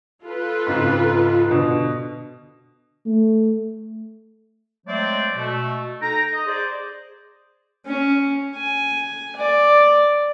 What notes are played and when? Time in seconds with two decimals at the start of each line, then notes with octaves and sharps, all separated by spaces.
0.24 F4 A4 B4
0.66 G#2 C#3 C4
1.51 B2 D3
3.06 A3
4.87 F#3 G#3 A3 C4 C5 D5
5.34 B2 A3
6.01 D#4 A4 G5 A#5
6.31 D#5
6.47 G#4 C5 D5
7.86 C#4
8.56 G#5
9.36 D5